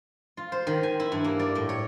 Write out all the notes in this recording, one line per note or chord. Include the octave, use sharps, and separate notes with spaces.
F4
C5
D#3
G#5
E4
G2
A#3
D5
A2
C#5